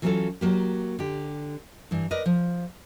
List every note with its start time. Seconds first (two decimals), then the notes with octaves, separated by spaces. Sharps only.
0.02 E3 F#3 B3 C#4 F4 A4
0.41 F#3 A#3 G4
0.99 D3 G4
1.91 G2 E3
2.11 A#4 B4 D5 D#5
2.26 F3